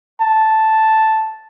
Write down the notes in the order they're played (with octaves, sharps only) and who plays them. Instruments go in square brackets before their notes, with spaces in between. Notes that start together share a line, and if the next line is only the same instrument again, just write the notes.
[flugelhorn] A5